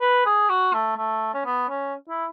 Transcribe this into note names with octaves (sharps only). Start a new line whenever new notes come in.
B4
G#4
F#4
A3
A3
C#4
B3
C#4
E4